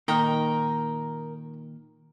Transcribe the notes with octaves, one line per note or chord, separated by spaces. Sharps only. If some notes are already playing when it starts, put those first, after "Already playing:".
A#2 D#3 A#4 D#5 G5